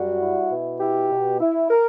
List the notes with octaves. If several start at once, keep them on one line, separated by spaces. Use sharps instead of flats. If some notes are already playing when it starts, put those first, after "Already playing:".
Already playing: F#2 G3 F#4
E4
B2
E4 G4
B2
E4
A#4